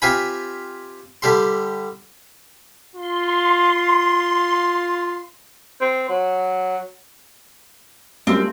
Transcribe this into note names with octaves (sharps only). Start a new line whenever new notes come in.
C4 F4 G4 E5 G#5 B5
D3 G3 G4 E5 C6
F4 C6
C4
F#3
F#2 G3 A3 A#3 C4 F4